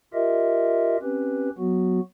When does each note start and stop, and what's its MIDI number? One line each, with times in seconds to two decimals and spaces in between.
0.14 0.97 65
0.14 0.97 67
0.14 0.97 70
0.14 0.97 75
0.14 0.97 76
1.02 1.50 60
1.02 1.50 61
1.02 1.50 67
1.02 1.50 71
1.58 2.00 54
1.58 2.00 59
1.58 2.00 66